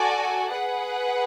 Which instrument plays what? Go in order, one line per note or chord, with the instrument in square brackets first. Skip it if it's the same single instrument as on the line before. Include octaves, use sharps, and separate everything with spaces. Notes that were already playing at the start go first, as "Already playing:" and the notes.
Already playing: [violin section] F#4 A4 D5 G#5
G#4 B4 F#5